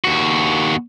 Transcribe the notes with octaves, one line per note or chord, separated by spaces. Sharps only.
D#2 F#4